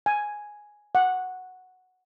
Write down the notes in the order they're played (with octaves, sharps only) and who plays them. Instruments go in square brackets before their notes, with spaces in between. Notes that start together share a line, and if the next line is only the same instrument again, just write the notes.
[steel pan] G#5
F#5